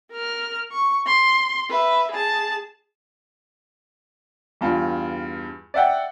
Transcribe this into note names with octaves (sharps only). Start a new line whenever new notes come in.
A#4 F6
C#6
C6
B4 E5
G#4 A5
E2 G2 F4
D5 E5 F#5 G5